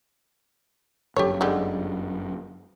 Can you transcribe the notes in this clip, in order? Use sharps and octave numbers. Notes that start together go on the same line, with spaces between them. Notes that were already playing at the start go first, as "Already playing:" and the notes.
G1 F#2 G4 A4 C#5
D3 G3 G#3